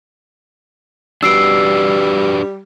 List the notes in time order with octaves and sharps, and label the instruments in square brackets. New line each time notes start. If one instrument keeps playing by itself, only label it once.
[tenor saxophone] G3 [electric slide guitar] D4 F#4 B4 [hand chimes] E6 C7 D7